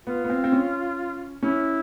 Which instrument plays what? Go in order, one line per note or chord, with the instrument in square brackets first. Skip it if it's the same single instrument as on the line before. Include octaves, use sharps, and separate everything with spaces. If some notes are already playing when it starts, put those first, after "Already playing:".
[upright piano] B3 [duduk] F4
[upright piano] B3
C4
C4
C#4
[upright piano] C#4 [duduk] E4